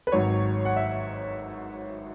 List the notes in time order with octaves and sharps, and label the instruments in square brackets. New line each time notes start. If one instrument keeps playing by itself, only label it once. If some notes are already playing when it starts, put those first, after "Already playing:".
[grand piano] B4
G#1 G#2 F#3 C#5
F#5
E5